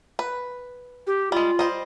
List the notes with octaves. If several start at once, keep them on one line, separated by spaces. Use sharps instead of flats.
B4
G4
G3 G#3 F4
G3 C5 D#5